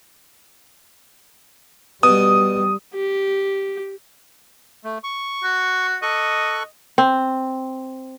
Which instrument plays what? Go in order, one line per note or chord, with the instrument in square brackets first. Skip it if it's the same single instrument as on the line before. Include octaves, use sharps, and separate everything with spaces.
[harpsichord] B2 [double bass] G3 [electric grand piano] D#6
[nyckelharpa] G4
[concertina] A3
C#6
[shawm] F#4
[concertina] A4 C#6 F#6 [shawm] D#5
[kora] C4